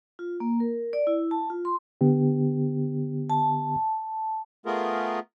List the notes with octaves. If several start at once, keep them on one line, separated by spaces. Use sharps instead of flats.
F4
A#3
A#4
D5
E4
A5
F4
C6
D3 B3 G4
A5
A3 B3 F4 G#4 A#4